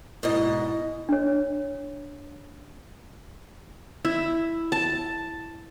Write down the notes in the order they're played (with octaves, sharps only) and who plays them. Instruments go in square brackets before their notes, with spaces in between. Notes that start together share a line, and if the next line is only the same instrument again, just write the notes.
[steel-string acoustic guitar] G#2 B2 D#5 [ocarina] E4
[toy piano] D4 C#5
[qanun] E4
A5